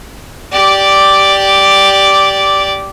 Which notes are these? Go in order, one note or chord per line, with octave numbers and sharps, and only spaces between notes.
G4 D5